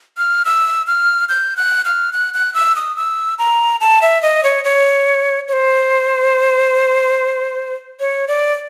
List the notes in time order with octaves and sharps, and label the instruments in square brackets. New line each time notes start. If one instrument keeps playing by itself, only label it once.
[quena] F6
E6
F6
G6
F#6
F6
F#6
F#6
E6
D#6
E6
A#5
A5
E5
D#5
C#5
C#5
C#5
C5
C#5
D5